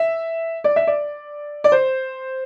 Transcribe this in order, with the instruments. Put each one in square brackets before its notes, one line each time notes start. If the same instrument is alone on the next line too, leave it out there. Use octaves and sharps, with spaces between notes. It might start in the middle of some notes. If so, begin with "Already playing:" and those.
Already playing: [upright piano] E5
D5
E5
D5
D5
C5